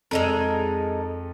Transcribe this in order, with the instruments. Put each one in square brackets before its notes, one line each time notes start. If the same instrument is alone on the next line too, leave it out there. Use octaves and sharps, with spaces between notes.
[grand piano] F2 [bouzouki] G#3 D#4 A#4 [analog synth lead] A4